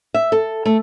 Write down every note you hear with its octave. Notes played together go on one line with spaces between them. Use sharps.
E5
A4
A3